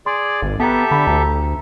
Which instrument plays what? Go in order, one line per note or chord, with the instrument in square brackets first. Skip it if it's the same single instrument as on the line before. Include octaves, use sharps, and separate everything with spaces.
[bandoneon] G#4 D5 [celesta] C6
[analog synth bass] G#1
[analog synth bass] B3 [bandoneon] G4 A4 E5 [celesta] A5 A#5
[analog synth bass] D3 [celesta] B5
[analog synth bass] D2 [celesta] A#5